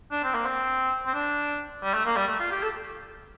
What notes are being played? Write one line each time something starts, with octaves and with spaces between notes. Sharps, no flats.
D4
C4
A#3
C4
C4
D4
G3
A3
A#3
G3
A3
F4
G4
A4